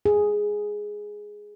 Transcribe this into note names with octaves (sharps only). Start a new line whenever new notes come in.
G#4